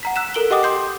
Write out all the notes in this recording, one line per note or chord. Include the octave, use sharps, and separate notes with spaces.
F#5 A#5 B6
E6 F#6 B6 E7
A4 A#4 D7 F#7 G7
G4 D#5 F#5 G5 D6 D#6
C6 G6 C7